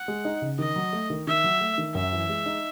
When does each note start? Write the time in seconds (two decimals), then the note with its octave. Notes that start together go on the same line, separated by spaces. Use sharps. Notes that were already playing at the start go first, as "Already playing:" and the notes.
Already playing: F#5
0.08 G#3
0.25 D#4
0.42 C#3
0.59 D#3 D#5
0.76 F#3
0.93 A3
1.10 D#3
1.27 D#3 E5
1.44 F#3
1.61 A3
1.78 D#3
1.95 F#2 E5
2.13 E3
2.29 G#3
2.46 D#4